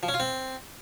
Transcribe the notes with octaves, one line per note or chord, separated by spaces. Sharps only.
F3
C#4
F4
C4